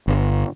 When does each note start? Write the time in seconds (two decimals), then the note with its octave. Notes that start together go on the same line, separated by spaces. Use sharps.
0.08 G1